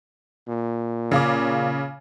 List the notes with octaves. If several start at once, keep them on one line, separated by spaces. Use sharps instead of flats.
A#2
C#3 F5 D6